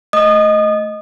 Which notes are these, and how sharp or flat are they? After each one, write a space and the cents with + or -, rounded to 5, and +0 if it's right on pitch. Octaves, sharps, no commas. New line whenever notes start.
A3 +0 D#5 +0 D#6 -30